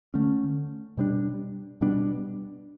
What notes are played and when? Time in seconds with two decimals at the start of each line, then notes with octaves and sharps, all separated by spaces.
0.14 D3 A3 C#4
0.97 B2 G3 B3 D4
1.81 B2 G3 B3 D4